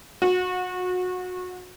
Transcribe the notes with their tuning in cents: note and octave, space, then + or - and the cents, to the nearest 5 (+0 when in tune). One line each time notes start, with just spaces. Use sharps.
F#4 -25